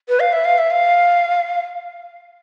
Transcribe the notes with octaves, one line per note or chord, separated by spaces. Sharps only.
B4
F5
E5
F5
E5
F5